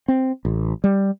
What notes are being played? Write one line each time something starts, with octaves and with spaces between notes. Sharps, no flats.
C4
A1
G3